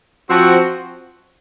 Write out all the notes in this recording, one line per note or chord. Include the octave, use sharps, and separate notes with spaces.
F3 C4 F#4